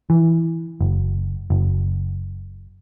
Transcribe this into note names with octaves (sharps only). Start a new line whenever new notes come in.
E3
F#1
F#1